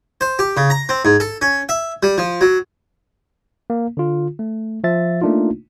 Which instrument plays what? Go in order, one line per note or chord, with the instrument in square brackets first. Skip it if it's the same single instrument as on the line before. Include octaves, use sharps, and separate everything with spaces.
[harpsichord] C5
G4
C#3
A#5
C4
G#2
A4
C#4
E5
G3
F3
F#3
[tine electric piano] A#3
D3 F4
A3
F3 E5 A6
A3 A#3 D4 D#4 F4